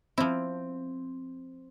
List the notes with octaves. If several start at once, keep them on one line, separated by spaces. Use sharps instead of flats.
F3 C4 E4